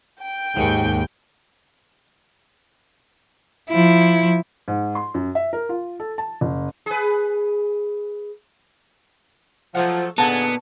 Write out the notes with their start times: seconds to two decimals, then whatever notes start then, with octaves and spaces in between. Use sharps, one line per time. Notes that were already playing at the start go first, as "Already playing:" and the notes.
0.22 G5
0.56 D#2 G#2 G#5 C#6
3.69 F3 E4
4.68 G#2
4.95 C6
5.14 F#2
5.35 E5
5.53 A#4
5.69 F4
6.00 A4
6.18 A5
6.41 F#1
6.86 G#4 B4
9.75 F3 F#3 A3 F#5
10.18 A#2 D3 B3 D#4 F#4 G#4 G#5 A5